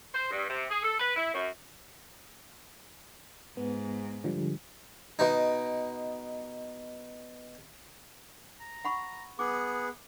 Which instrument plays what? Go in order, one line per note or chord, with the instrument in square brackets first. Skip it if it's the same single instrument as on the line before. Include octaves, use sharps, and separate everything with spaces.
[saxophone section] C5
G2
C3
G#4
A4
B4
E4
F#2
[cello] G#2 [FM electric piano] B3
[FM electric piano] D3 F3 G3
[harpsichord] B2 D#4
[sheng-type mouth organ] A#5
[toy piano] F#5 B5 C#6
[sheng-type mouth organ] B3 G#4 F#5 [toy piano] D6